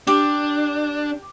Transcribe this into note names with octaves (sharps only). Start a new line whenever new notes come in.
D4 G4